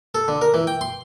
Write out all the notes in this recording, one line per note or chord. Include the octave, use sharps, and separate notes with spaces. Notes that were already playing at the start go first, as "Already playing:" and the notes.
A4
D3
A#4
E3
G5
C6